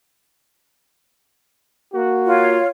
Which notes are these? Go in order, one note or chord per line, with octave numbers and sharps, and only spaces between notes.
A#3 F#4
F4 C#5